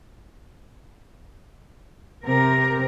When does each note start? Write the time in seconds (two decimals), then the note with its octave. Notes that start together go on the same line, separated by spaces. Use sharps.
2.26 C3 A#4